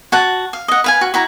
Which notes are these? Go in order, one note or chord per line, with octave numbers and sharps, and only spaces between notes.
F#4 F#5 A5
F5
D#5 F#5
B4 F5 G#5
F#4
E4 F#4 A#5